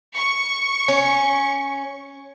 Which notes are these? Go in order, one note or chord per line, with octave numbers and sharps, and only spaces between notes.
C#6
C#4